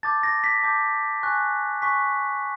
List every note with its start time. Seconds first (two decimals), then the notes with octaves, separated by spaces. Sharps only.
0.03 A5 D6 G6 A6
0.23 A#6
0.44 B6
0.63 A5 D6 G6
1.23 G#5 C#6 F#6
1.82 G#5 C#6 F#6 B6